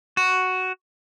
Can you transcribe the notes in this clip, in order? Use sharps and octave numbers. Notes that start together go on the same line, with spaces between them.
F#4